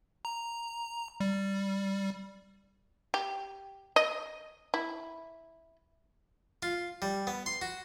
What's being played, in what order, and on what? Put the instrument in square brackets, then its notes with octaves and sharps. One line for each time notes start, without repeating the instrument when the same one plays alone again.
[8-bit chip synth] A#5
G3
[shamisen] G4
D#5
E4
[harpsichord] F4
G3
B3
C6
F#4